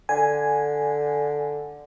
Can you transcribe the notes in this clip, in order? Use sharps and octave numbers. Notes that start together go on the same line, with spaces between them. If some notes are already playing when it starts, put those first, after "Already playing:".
D3 G#5